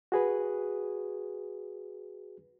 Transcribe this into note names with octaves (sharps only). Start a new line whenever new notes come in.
F#4 G#4 B4